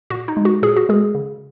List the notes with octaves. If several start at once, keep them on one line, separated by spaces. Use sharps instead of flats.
A#2 F#4
D#4
G#3
F#4
A#2 G#4
F#4
G#3 G#4
C#3